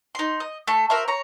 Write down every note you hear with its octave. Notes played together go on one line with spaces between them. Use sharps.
D#4 C6
D#5
A3 A4
F#4 A#4 C5 E5
C#5 A#5